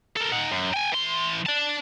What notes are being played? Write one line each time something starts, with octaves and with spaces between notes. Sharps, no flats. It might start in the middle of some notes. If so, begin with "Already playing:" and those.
A4 A#4
D#4 F#5
F#2
G5 G#5
E3 C6
D5 A5